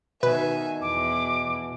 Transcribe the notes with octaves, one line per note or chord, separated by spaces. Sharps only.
B2 D#3 B4 E5 G#5
E2 E3 D6